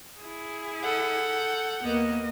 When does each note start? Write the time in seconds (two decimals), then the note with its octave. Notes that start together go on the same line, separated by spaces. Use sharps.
0.19 E4 G#4
0.84 A4 F#5 G6
1.84 D#2 A#3 B3 D#5